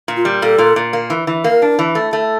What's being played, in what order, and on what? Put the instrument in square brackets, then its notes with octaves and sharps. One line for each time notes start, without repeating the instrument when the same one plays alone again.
[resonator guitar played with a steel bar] A#2
[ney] F4
[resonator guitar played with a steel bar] G3
[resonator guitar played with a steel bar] A#2 [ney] A4
[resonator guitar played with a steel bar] A#2
A#2
A#3
E3
E3
[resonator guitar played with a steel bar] A#3 [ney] A#4
[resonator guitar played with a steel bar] D4
E3
A3
A3